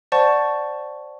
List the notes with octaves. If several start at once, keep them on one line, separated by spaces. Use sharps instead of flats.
C5 D5 F#5 A5 C#6